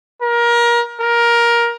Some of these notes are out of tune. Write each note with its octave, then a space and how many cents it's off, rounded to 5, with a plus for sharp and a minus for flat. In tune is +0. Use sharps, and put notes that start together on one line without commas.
A#4 +25
A#4 +15